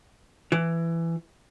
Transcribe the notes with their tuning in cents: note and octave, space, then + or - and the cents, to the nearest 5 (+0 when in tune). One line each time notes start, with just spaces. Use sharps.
E3 +15